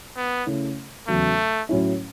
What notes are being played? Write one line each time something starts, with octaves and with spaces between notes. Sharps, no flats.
B3
C#3 A3 E4
E2 C#3 F#3 A3
A2 F#3 C#4 E4